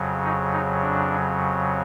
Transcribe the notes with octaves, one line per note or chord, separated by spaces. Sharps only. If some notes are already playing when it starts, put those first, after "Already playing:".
Already playing: F2 C#3 F#3
D#4
D#4
D4